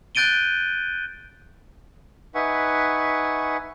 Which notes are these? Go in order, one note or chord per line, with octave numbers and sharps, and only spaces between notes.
F#6 G6 A6 D7 D#7 G7
D#4 B4 E5 F#5 G#5 C#6